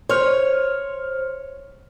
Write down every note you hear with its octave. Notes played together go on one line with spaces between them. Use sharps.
C5 C#5 F6